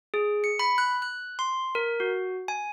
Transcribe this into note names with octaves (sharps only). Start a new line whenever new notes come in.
G#4
C#7
B5
F#6
F#6
C6
A#4
F#4
G#5